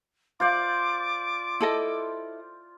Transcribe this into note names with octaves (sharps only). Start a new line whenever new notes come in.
F4 C5 D5 D6
E4 A4 D#5